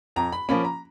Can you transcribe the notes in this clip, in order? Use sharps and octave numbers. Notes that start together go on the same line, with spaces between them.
F2 A#5
B5
F3 A#3 C#4 B5
A#5